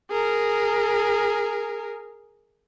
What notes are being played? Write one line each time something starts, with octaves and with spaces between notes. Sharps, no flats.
G#4 A#4